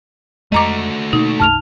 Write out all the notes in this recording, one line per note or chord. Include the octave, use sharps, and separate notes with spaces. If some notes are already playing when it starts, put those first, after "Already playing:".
F2 G#3 A3 F#4 D#5 A#5 D6
B2 A#3 D#4
C#2 G2 C3 A5 F6 F7